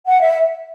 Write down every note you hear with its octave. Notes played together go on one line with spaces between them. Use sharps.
F#5
E5